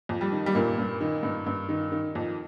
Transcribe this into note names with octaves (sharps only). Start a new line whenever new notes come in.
F2
G3
D#3
G3
G2 A#2 A#3
G2
D#3
G2
G2
D#3
D#3
F2